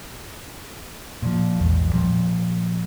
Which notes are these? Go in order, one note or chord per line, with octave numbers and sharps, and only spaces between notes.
A#2 F3
A#1 E2 G#2
A#2 F3 G3